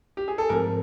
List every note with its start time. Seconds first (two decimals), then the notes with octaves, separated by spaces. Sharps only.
0.17 G4
0.28 G#4
0.38 A4
0.49 G#2 F3 A3 C4 A#4